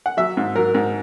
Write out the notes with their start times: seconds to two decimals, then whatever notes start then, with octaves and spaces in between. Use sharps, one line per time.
0.06 F#5
0.17 F#3 E5
0.37 G#2
0.55 F#3 A#4
0.74 G#2